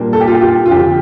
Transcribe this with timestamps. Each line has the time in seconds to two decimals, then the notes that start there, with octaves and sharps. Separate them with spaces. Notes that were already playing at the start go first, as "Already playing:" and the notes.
Already playing: A#2 G3 A#3 D4
0.13 A4
0.20 G4
0.27 F4
0.35 G4
0.41 F4
0.66 F4
0.71 F2 D3 F3 G4